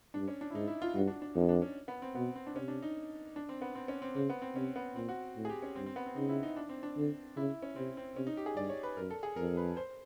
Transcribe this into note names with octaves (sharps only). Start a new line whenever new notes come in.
G2 D4
C#4
D4
E4
G#2 D#4
E4
F4
G2 F#4
D4
D4
F2 D#4
D4
C#4
B3
C4
B2 B3
C4
D4
C3 C#4
D4
D#4
D4
C4
B3
C4
C#4
C4
C#3 C4
B3
C4
C3 C#4
B3
A#2 C4
F#4
A2
G#4
G4
C#4
G2 C4
C4
B3
C4
C#3 D#4
E4
D#4
D4
C4
D4
D3
C#3 E4
C#4
C3 C4
C4
C3 C#4
D#4
G4
G#4
G2 D5
C#5
B4
F#2 A#4
A4
G#4
F2 A#4
B4
C5